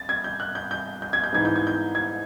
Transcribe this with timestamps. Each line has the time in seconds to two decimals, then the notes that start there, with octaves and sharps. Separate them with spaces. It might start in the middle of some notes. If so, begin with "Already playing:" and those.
Already playing: A6
0.09 G#6
0.24 G6
0.40 F#6
0.55 G6
0.71 G6
1.02 G6
1.13 G#6
1.24 G6
1.32 G#2 E3 G#6
1.45 G6
1.56 G#6
1.67 G6
1.95 G#6